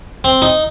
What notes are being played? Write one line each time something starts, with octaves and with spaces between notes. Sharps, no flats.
C4
D#4